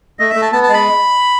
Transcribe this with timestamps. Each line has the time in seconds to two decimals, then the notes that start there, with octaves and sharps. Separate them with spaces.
0.19 A3 D#5
0.30 E5
0.35 A3
0.42 A5
0.52 B3 A5
0.63 A5
0.68 G#3
0.74 B5